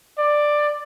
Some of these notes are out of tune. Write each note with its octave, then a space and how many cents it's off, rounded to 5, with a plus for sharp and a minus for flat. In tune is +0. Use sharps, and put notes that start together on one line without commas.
D5 +10